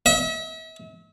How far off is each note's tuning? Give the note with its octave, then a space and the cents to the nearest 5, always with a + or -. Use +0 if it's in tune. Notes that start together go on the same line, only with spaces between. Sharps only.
E5 -40